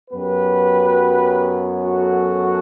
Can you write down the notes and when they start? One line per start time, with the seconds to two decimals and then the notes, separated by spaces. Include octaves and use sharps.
0.11 F#2 F#3 B3 G4 B4
1.86 F#4 A4